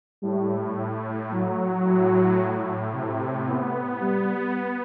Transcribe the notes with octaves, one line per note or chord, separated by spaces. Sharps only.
A2 G3
F#3 A3
A2 F#3
A2
C3
B3
G3